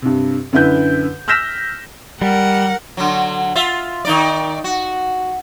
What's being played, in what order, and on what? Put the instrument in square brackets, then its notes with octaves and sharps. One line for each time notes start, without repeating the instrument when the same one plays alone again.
[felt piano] G2 C3
F#2 D3 E4 B4 G6
E6 F6 G6 A#6 B6 E7
[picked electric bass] G3 [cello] A#4 F#5
[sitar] D3 F#3
F4 E5
D#3 D#4 D5
F#4